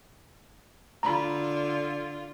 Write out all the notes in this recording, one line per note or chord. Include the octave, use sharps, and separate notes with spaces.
D3 F4 A#5 B5